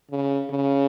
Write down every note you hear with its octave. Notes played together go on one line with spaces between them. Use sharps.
C#3
C#3